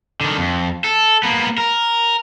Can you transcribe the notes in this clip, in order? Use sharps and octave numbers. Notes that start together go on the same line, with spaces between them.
D3 D#3
F2
A4
A#3 B3
A#4